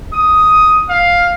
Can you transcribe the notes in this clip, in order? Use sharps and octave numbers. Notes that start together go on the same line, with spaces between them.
D#6
F5